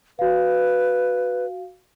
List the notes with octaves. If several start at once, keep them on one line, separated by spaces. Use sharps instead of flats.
F#4 B4 F5